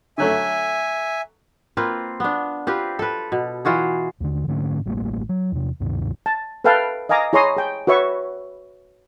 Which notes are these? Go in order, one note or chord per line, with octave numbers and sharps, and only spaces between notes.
D3 F#3 A3 E5 G#5
A#3 C4 F4 B4
B3 D4
C4 F4 G4 B4
A4 B4
B2
E3 F4 F#4 G#4
D#2 D3
G#2 D3 A3 C#4
A1 G3 A3 A#3
F#3
E2 C3
D2 G2 C3 D#3
A5
A4 B4 E5 F5 G5 A5
D#5 F5 G#5 A#5 D6 D#6
E4 G#4 C#5 A#5 C6 D#6
G#4 G5
F#4 B4 C#5 E5 C#6